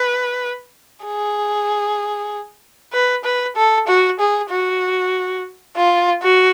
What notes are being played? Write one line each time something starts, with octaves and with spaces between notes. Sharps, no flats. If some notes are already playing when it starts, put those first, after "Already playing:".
Already playing: B4
G#4
B4
B4
A4
F#4
G#4
F#4
F4
F#4